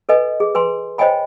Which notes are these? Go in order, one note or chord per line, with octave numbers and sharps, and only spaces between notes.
A4 B4 D#5 G#5
G#4
B4 G#5 C6
C5 C#5 D#5 G5 G#5 B5